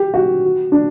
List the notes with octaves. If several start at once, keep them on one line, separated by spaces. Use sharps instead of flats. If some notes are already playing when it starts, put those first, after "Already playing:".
Already playing: G4
F#4
D4